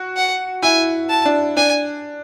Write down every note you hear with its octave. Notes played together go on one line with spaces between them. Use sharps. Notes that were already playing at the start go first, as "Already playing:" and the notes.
Already playing: F#4
F#5
E4 G#5
A5
D4
D4 G#5